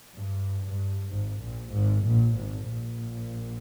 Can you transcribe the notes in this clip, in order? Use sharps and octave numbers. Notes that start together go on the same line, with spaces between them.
G2
G2
G#1 G#2
A#1 A#2
G#1 G#2
A#1 A#2
G#1 G#2
A#1 A#2